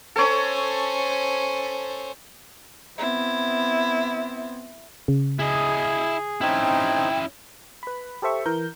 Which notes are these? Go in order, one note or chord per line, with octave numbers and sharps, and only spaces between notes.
C#4 A4 C5 C#5
B3 C4 E4
C#3
E4 G#4 D#5
C4 C#4 D#4 E4 G5
B4 B5
G4 A4 C5 E5 C#6
E3 A#4 G6